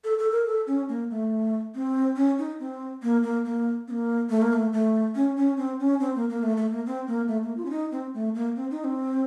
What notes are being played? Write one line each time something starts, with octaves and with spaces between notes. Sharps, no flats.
A4
A4
A#4
A4
C#4
A#3
A3
C4
C#4
D#4
C4
A#3
A#3
A#3
C4
A#3
A3
A#3
A3
A3
C#4
C#4
C4
C#4
C4
A#3
A#3
A3
A3
A#3
C4
A#3
A3
A#3
F4
C#4
D#4
C4
A3
A#3
C4
D#4
C4